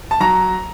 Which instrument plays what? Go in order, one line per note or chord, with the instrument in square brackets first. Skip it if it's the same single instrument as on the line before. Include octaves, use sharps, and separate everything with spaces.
[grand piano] A5
F#3 A#5